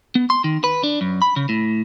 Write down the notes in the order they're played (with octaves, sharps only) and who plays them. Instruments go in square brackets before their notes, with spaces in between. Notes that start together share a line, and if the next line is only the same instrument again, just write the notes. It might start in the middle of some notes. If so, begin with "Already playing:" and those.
[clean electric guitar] B3
C6
D#3
B4
D4
F#2
B5
C#3
A2